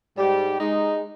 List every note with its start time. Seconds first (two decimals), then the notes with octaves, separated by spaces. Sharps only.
0.17 G#2 G3 G4
0.60 G#3 D#4